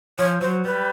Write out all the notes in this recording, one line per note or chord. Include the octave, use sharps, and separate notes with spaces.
F3 C#5
F#3 C5
G3 B4